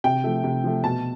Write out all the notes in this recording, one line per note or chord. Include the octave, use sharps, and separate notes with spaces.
C3 G5
F3 A3
C3
F3 A3
B2 A5